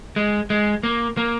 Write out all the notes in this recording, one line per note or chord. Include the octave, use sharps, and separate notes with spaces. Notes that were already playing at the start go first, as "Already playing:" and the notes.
G#3
G#3
A#3
A#3